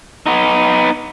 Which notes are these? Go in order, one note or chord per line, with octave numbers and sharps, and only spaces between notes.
B3 D#4